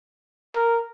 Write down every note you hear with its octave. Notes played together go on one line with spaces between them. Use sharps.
A#4